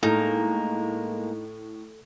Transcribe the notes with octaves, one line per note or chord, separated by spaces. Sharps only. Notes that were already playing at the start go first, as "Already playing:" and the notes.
A2 G#3 A#3 D#4 A4 A#4